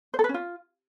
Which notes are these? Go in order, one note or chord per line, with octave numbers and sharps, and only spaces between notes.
C5
A4
B4
C#4
F4